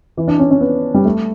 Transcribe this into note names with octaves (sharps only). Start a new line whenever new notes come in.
E3
D4
C#4
C#4
B3
G3
A3